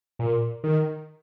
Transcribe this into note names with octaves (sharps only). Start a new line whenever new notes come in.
A#2
D#3